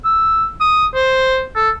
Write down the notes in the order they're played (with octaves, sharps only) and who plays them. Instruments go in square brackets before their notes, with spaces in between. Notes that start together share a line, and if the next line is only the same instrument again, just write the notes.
[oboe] E6
D#6
C5
A4